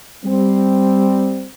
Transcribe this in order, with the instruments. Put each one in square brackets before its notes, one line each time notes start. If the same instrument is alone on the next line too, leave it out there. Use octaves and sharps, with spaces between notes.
[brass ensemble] G3 C4